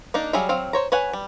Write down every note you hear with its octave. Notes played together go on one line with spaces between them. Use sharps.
A#3 D4 D#4
F#3 G3 G#4 E5 F5
F#3 C4 F5
C5 C#5 A#5
B4 C#5 F#5 G#5
G3